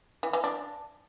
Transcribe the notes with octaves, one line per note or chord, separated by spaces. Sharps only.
E3
E3
D4